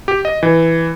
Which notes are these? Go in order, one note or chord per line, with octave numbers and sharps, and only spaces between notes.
G4
D#5
E3